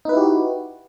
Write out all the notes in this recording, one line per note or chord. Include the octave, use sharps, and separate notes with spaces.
D#4 E4 F#4 G4 B4